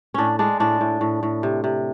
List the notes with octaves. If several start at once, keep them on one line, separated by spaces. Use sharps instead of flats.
A2 C#4 D4
G#3 D4
A2 D4
A2
A2
A2
C3
C3